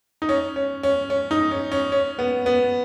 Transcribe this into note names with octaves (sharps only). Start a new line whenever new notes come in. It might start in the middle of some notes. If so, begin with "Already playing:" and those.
D#4
C#4
C#4
C#4
C#4
D#4
C#4
C#4
C#4
B3
B3